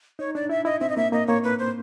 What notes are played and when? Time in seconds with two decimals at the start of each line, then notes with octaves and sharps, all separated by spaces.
0.19 D#4 C#5
0.35 D4 D5
0.49 E4 E5
0.65 E4 D#5
0.81 C4 E5
0.89 D#5
0.97 A#3 E5
1.12 A#3 D#5
1.27 A#3 C#5
1.44 B4
1.59 C5